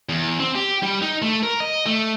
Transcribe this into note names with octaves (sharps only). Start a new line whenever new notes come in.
E2
C4
G4
G3
D#4
A3
A#4
D#5
A3